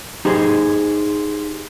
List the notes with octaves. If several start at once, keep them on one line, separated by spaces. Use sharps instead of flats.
D#4 G4 G#4 C5